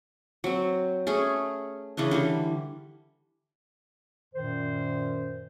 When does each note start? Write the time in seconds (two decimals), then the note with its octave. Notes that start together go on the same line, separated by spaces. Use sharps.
0.44 F#3 C4
1.07 A3 C#4 G#4
1.97 C#3 E3 C#4 D4
2.11 D3 E3 G3
4.34 F#2 A#2 D#3 C5